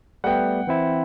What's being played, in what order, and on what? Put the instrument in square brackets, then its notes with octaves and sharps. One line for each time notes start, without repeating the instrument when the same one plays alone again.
[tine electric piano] G3 A3 B3 [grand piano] F#5 G5
[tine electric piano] E3 C4 E4